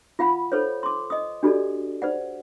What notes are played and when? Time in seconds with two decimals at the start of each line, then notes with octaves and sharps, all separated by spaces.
0.19 F4 F5 F#5 B5
0.52 A4 C5 C#5
0.83 C6 D6
1.10 D#5 D#6
1.43 D4 F#4 G4 A4 D5
2.02 C5 D5 F#5